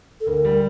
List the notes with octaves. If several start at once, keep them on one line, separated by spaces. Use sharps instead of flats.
A4
D2 A#4
G3